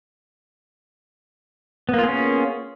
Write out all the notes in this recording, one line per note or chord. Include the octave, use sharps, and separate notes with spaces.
A#3 B3 C#4 F4 G#4